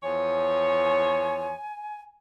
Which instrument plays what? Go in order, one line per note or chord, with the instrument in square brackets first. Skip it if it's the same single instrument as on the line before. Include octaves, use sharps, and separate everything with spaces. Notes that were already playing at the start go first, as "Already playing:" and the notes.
[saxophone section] E2 F3 C#5 [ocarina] G#5